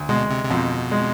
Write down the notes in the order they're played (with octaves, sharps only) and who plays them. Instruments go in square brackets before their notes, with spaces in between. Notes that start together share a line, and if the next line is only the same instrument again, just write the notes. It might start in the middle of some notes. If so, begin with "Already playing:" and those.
Already playing: [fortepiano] D2
[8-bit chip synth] B2 [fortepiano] G#3
[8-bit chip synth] C3
C3
[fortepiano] F2 [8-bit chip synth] B2
[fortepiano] G#3